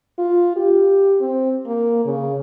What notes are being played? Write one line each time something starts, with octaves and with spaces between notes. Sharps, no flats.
F4
G4
C4
A#3
C#3